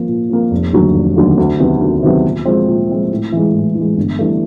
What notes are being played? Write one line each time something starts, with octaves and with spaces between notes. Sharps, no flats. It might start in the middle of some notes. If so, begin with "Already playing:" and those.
Already playing: F3 A#3
A#2
F3 A#3
F1
D#2 D3 F#3 A3
F1
D#2 D3 F#3 A3
D2
C3 D#3 F#3 B3
D2
C3 D#3 F#3 B3
A#2
F3 G#3 C4
A#2
F3 G#3 C4
A2
E3 G#3
A2
E3 G#3
G1
G2 E3 A3